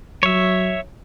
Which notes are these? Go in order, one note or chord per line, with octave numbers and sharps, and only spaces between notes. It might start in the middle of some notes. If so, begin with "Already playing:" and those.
F#3 C#5 E5